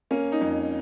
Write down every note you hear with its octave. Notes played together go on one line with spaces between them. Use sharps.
A#3 C#4
D#4
F2 C#4